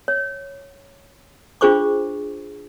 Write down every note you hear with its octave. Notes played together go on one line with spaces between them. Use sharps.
C#5
D4 F4 G#4 C5 C#6 D6